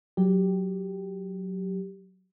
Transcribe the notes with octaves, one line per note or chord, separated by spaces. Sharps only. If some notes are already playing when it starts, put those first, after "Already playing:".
F#3 G4